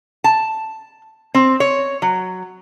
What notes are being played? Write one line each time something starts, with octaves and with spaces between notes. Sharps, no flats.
A5
C4
C#5
F#3